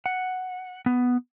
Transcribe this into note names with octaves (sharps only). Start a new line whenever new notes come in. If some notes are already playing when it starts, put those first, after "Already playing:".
F#5
B3